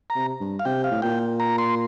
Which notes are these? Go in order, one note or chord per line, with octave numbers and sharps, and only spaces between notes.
A#5
C3
G2
F5
C3 G5
F5
A2
A#2 G5
A#5
C6